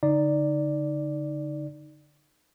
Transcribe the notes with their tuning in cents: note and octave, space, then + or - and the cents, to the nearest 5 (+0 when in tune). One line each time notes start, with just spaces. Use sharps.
D3 -30 D#4 -10 D5 +0